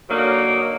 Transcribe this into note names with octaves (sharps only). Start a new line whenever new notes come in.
D3 F#3 A#3 D#4